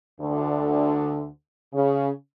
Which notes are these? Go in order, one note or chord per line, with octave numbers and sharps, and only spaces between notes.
D2 D3
C#3